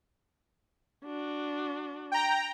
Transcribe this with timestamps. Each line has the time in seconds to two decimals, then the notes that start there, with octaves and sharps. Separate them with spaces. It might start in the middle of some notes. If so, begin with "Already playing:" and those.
1.05 D4 F#4
2.12 G5 A#5